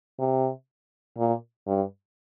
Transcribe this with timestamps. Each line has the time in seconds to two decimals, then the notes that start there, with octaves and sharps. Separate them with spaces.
0.19 C3
1.18 A#2
1.67 G2